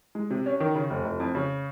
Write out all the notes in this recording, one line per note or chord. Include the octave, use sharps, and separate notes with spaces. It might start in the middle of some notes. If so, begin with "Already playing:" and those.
G#3
C3
C#4
D#3
C#3
F1
F1
F2
C#3